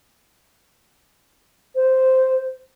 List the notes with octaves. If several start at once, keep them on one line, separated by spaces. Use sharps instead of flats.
C5